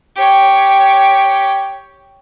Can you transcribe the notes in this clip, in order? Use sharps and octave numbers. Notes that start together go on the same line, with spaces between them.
G4 C#5